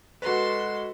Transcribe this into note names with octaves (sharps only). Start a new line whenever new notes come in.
G#3 F#4 A4 B4 C6